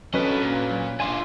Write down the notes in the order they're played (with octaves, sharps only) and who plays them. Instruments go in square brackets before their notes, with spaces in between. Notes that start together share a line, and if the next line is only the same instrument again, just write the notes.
[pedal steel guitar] F#3 D4 [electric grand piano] C#4 B4 [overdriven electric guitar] A4 D#5
[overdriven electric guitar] A#2
[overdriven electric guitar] D4 F4 [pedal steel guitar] G#5 C6 D6